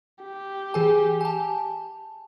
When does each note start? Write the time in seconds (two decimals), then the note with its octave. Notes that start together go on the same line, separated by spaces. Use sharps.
0.24 G4
0.74 E3 G#4 G#5
1.21 G#5 A5